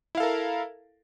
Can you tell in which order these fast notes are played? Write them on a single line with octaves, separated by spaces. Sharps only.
E4 F5 A4 A#4